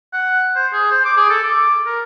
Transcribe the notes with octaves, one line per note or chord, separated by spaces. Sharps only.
F#5
C5
G#4
C5
D6
G#4
A4
D6
A#4